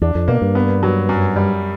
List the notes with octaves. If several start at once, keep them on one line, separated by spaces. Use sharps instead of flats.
E2 D4
F2
B2 A#3
G2
B3
F#3
F#2
G3